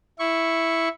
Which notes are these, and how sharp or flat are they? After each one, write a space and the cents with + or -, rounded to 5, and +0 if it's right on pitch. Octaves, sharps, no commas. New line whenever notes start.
E4 +0 C#6 -5